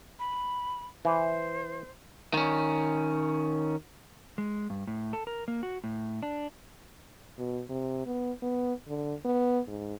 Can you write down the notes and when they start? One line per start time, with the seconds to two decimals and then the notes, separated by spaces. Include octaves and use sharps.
0.19 B5
1.05 E3 C5
2.34 D#3 C#4
4.38 G#3
4.70 G2
4.87 A2
5.13 A4
5.27 A#4
5.48 A#3
5.63 F#4
5.84 A2
6.23 D4
7.38 B2
7.69 C3
8.06 B3
8.42 B3
8.88 D3
9.25 B3
9.68 G#2